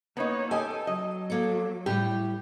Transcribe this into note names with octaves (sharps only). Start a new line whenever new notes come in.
A#3 B3 D#4 C#5
G4 A4 D#5 G#5
F#3 D#5
A#3 A4
A2 G3 G4